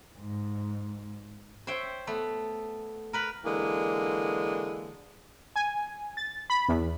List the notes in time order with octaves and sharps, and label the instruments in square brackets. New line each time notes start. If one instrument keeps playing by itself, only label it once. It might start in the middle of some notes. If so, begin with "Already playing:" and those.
[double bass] G#2
[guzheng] C5 C#5 E5 G5
A3 B3
A#4 B4 B5
[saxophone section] D3 E3 G#3 A#3
[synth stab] G#5
A6
B5
E2